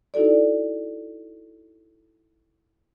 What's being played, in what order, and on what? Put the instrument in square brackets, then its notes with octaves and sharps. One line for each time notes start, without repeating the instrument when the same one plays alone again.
[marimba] D#4 E4 F#4 A4 D5